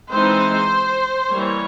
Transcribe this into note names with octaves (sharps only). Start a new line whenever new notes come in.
E3 G#3 C4 D#4 C5
E3 G3 A#3 C#5